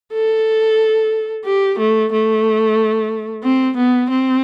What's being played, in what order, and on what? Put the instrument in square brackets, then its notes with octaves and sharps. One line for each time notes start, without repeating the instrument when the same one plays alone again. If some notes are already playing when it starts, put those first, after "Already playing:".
[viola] A4
G4
A3
A3
C4
B3
C4